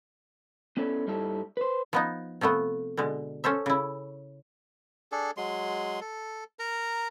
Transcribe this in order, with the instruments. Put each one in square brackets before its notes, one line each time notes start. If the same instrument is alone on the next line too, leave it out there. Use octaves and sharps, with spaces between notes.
[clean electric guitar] B3 C#4 E4 A4 C#5 D5
G2 G3 D#4 E4 A4
B4 C5
[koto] F3 B3 D#4
C3 F3 A3 B3
B2 D3 G#3
C#4 A4 C5 E5
C#3 E4
[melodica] D4 G#4 A4
F#3 G#3 C6
A4
A#4 A#5